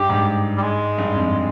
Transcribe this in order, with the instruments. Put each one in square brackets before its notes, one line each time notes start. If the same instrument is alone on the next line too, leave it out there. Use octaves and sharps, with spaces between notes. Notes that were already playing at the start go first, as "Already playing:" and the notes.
Already playing: [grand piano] G2 [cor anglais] G4
[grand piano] G#2
[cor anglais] G3
G#3
[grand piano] G2
F2